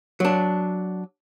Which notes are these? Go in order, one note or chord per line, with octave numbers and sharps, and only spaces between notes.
F#3 D4